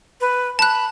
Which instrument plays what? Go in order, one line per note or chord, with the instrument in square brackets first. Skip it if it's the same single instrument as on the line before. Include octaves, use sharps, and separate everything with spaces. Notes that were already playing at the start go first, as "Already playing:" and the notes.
[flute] B4
[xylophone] A5 F#6 [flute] B5